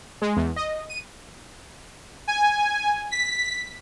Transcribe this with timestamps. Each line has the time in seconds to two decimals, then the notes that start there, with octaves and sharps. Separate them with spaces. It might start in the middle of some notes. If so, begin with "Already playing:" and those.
0.22 G#3
0.37 E2
0.56 D#5
0.89 D#7
2.28 G#5
3.11 B6